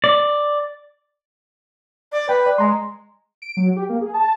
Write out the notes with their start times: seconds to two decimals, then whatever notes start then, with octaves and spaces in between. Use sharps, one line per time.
0.04 D5
2.12 D5
2.29 B4 G5
2.46 D5
2.58 G#3 D#5 A#5 C6
3.42 D7
3.57 F#3
3.76 G4
3.89 A#3
4.01 G#4
4.14 A5